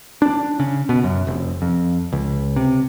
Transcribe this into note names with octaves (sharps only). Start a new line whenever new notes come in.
D4
C#3
B2
F#2
F1
F2
C#2
C3